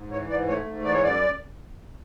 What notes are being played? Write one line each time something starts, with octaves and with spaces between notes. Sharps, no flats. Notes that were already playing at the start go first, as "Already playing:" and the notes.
Already playing: G#2
E3 C#5
G#2 D5
A3 C#5
G#2
E3 D5
C#5
F#2 D5